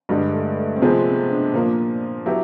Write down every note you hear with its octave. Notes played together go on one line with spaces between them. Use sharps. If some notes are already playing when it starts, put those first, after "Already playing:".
G2 D3 G3 G#3
A3
A3
C4
C3 F3 G#3 B3
C4
D4
A#2 F3 A#3 D4
F#3 B3 E4 G4